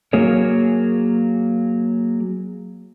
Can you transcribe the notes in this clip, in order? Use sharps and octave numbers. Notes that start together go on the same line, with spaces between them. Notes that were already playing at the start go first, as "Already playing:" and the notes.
F#3 A#3 G#4 A#4 C#5